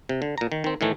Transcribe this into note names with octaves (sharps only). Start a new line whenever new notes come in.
C3
D3
A#2 A#5
D#3
D#3 C4
A2 D#3 E3 A3